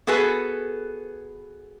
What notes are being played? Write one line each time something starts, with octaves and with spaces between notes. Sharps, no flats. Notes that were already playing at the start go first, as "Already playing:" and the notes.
B3 F#4 G#4 A4 B4